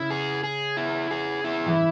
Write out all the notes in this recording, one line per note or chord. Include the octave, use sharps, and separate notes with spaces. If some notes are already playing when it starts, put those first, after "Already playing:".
Already playing: C#3 E4
G#4
G#4
E4
G#4
E4
E3